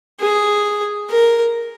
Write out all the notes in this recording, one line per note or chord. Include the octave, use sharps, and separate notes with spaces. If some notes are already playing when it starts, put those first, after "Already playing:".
G#4
A#4